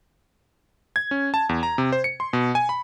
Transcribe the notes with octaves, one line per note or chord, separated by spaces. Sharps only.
G#6
C#4
A5
E2
A#5
C3
C5
C#7
C6
B2
G#5
B5